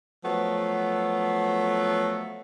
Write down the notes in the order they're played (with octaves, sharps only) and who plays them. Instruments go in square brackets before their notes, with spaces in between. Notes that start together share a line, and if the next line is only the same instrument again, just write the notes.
[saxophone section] F3 F#3 A3 B3